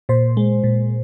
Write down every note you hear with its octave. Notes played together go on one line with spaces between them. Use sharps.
A#2 C5
G#3
A#2